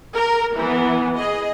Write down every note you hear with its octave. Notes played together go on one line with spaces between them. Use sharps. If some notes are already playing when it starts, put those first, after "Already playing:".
A#4
E3 B3
G#4 D#5